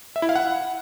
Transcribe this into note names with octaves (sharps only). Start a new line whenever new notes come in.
E5
E4
F5
F#5